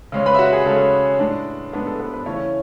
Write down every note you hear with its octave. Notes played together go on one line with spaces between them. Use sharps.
C#3 G#3 C#4
B4 B5
E5
F#4 F#5
G#4
C#3 G#3 C#4 A4
A2 G#3 D4
A2 G#3 B3 D4 B4
A4
B3 B4
B3 B4
C#3 E3 A3 C#4 C#5